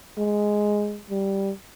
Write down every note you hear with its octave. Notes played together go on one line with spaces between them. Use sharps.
G#3
G3